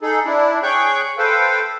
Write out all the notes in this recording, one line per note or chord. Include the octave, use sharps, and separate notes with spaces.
D#4 G#4 A4
D4 E4
G#4 C#5 G5 C#6 F#6 G6
A4 B4 C5 F5 G5